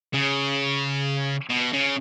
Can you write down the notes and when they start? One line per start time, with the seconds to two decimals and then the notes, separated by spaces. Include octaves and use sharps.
0.14 C#3
1.49 B2
1.73 C#3